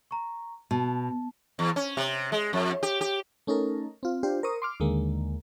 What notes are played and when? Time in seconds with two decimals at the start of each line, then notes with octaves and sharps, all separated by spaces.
0.11 A#5 C#6
0.71 B2 A5
1.59 E2
1.76 C#4
1.97 C3
2.32 G#3
2.53 F2
2.83 G4
3.01 G4
3.47 A3 C#4 D#4 A4 A#4
4.03 C4 F4
4.23 D4 F4 G4 C5
4.43 A#4 C5 C#6 D#6
4.62 C6 D6 F6
4.80 D#2 D3 G#3 A#3